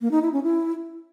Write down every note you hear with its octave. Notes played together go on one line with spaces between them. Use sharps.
A#3
D#4
E4
C#4
E4